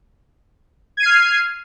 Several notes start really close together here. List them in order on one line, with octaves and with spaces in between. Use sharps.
G#6 D#7 C7 F6